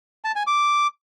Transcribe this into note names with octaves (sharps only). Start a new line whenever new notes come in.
A5
G#5
D6